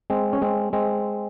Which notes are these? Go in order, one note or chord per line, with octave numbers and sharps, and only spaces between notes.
G#3 C4
C#4
G#3 C4
G#3 C4